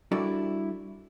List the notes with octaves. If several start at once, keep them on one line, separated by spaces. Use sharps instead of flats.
G3 D4 E4 F#4 A4 D5